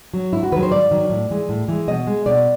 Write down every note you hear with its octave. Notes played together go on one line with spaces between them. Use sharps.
F#3
G#2 E4
F#4
D#3 F#3 B4
C5
G#2 D5
D#3 F#3
A2
E3 G#3
A2
E3 G#3
B2 D#5
G#3
B2 D5